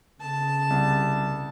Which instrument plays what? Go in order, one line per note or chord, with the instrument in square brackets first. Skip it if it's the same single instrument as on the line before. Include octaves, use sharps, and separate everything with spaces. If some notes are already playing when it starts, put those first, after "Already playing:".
[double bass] C#3 [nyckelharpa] A5
[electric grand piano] C2